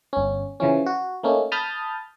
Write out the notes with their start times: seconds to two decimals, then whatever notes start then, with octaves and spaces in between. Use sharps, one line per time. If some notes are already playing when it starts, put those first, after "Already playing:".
0.13 G1 C#4
0.60 C#3 E3 F3 C#4
0.86 F#4
1.23 A3 A#3 C#4 D#4
1.52 A5 B5 D#6 F6 G6 A6